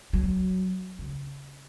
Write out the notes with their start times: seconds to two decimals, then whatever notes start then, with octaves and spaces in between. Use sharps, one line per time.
0.13 F#3
0.99 C#3